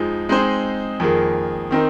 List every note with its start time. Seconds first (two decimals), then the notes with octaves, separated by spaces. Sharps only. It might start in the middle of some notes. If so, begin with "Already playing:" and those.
Already playing: F2 F3 G#3 D#4 G#4
0.29 G#3 C4 D#4 G#4 C5
1.00 F2 D#3 A#3 G#4
1.71 D#3 C4 D#4 A#4